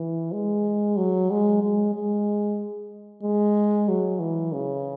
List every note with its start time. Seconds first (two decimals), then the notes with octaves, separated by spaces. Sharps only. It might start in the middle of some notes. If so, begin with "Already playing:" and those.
Already playing: E3
0.33 G#3
0.97 F#3
1.31 G#3
1.63 G#3
1.94 G#3
3.23 G#3
3.88 F#3
4.20 E3
4.53 C#3